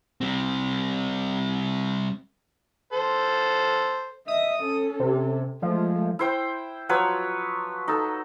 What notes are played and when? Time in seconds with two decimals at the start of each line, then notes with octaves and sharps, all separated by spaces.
0.21 G3 C4
2.93 A4 C5
4.28 D#5 E5 D#6
4.63 C#4 A4
4.99 C3
5.62 F3 G#3 A3
6.19 E4 C5 G5
6.89 F3 F#3 B4 C#5
7.88 D#4 A4